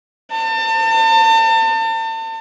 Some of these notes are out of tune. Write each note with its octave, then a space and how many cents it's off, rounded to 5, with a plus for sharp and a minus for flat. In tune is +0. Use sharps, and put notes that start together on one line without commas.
A5 +35